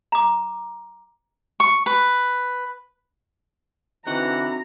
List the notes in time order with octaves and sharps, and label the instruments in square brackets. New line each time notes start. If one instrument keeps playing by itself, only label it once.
[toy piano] A#5 D6
[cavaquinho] C#6
B4
[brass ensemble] D3 E3 [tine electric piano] C4 D#4 F#4 [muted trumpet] F#5 [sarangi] A#5